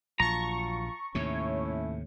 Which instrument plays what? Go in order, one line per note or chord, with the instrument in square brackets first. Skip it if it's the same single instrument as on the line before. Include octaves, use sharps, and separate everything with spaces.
[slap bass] A#1 [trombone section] F#3 F4 [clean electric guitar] A5 A#5 [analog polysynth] C#6
[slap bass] D#2 A2 C3 [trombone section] A3 C#4 E4 [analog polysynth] C#5